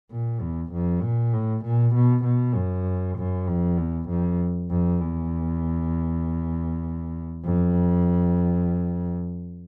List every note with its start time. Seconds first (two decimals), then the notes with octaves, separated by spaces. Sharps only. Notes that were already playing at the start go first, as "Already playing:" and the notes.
0.11 A#2
0.41 E2
0.73 F2
1.03 A#2
1.33 A2
1.65 A#2
1.95 B2
2.25 B2
2.55 F#2
3.18 F#2
3.47 F2
3.78 E2
4.09 F2
4.70 F2
5.01 E2
7.45 F2